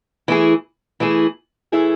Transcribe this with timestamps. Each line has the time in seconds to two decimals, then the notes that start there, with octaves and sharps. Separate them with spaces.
0.28 E3 A3 E4 G#4
1.00 E3 A3 E4 G#4
1.72 E3 A3 E4 G#4